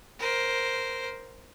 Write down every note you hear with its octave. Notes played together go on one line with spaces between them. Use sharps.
A#4 C5